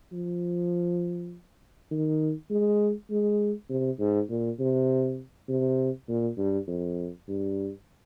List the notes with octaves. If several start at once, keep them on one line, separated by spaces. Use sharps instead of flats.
F3
D#3
G#3
G#3
C3
G#2
A#2
C3
C3
A#2
G2
F2
G2